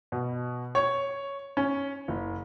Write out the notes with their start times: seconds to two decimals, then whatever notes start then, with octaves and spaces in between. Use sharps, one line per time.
0.12 B2
0.75 C#5
1.57 C#4
2.08 F#1